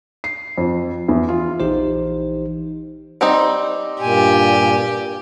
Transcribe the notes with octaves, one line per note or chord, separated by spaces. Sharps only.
C7
F2
E2
F4
A#1 E3 D#4 G4 C5
G3 C4 D#4
G2 A#2 G4 G#5